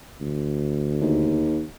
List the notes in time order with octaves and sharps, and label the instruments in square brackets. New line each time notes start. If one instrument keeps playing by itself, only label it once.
[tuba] D2
[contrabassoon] D#2